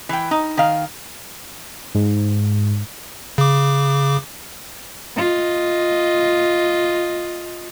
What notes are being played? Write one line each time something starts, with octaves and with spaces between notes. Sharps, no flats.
E3 G5
D#4
D#3 F5
G#2
C#3 D6
F4 D#5